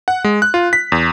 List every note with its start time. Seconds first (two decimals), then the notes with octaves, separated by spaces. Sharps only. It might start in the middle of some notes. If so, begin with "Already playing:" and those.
0.08 F#5
0.24 G#3
0.42 F#6
0.54 F4
0.73 B6
0.92 E2